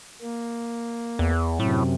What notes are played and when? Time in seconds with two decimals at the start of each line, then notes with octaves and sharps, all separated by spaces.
0.22 A#3
1.19 E2
1.60 F#2 A2 C3